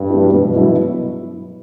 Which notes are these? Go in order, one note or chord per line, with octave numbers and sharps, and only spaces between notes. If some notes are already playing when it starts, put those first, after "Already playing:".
Already playing: G2
F#3 B3 E4
G2 B2
F#3 B3 E4